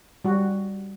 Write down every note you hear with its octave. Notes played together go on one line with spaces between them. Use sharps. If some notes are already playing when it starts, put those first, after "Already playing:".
G3 F#4